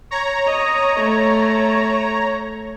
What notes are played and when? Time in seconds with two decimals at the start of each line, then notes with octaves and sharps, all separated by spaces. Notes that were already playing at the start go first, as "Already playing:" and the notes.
0.11 C#5 A#5
0.46 D#5
0.99 A3